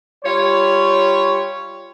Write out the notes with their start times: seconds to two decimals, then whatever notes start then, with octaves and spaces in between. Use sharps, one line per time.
0.24 G3 F4 C#5